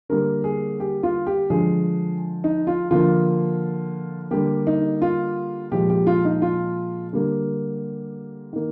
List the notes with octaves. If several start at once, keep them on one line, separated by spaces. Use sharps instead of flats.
D3 G3 A#3 A#4
G#4
G4
F4
G4
D3 F3 G#3 G#4
D#4
F4
D3 F3 A#3 F4
D3 G3 A#3 G4
D#4
F4
A#2 F3 G#3 G4
G4
F4
D#4
F4
D3 G3 A#3
D#3 A#3